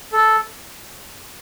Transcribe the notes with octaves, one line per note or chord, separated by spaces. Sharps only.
A4